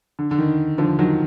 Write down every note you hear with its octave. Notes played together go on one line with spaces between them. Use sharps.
D3
D3
D#3
D3 F3
D#3 F#3